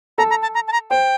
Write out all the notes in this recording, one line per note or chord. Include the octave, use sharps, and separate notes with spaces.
A4 A#5
A#5
A5
A#5
A5
A#5
C5 G5